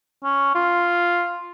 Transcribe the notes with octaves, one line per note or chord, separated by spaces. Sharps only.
C#4
F4